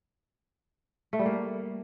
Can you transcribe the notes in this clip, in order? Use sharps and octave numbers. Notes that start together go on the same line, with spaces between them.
A3
G3
A#3